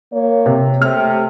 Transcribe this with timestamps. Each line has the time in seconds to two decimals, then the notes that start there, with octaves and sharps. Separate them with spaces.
0.13 A#3 C#5
0.46 C3
0.82 C3 A3 F6